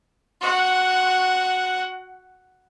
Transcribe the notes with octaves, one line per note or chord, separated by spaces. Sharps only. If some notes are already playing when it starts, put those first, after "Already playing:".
F#4 F#5